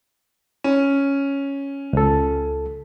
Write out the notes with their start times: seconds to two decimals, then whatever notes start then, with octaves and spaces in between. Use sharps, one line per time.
0.64 C#4
1.93 C#2 A4